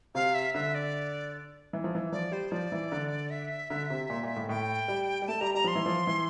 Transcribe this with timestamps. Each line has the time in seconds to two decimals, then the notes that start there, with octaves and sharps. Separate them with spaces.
0.15 C3 F5
0.35 E5
0.54 D3 E5
0.75 D5
1.73 E3
1.84 F3
1.95 E3
2.12 F3 D5
2.32 G3 C5
2.52 F3 D5
2.72 E3
2.92 D3
3.30 E5
3.70 D3
3.90 C3
4.10 A#2
4.23 A#2
4.36 A2
4.49 A2 G5
4.88 G3
5.22 G3
5.28 A3 A5
5.41 G3 A#5
5.55 G3 A#5
5.64 F3 C6
5.75 E3
5.86 F3
6.07 E3